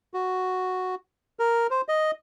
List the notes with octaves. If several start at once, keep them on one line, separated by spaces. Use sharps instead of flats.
F#4
A#4
C5
D#5